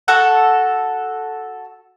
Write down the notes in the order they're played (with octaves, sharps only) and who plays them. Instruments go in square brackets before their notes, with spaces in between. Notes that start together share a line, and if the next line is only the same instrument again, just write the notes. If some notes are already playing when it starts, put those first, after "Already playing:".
[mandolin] F#4 A4 F#5